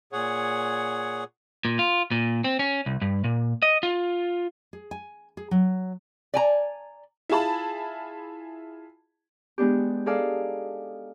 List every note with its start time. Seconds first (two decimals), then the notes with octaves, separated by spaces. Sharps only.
0.12 A#2 G#4 C#5 F#5
1.65 A#2
1.79 F4
2.11 A#2
2.44 C4
2.59 C#4
2.86 C2
3.02 G2
3.24 A#2
3.62 D#5
3.83 F4
4.73 G#4
4.91 G#5
5.37 G#4
5.51 F#3
6.34 D5 G#5 A#5
7.29 E4 F4 G#4 A5 B5
9.58 G#3 B3 D4 G4
10.06 D#4 G#4 A4 D5 F5